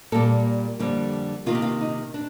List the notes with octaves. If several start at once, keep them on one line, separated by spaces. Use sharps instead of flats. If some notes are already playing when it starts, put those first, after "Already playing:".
A#2 G3 A#3 A4
F2 D3 G3 A#3
C3 D#3 A#3 F4
G4
F4
D#4
D4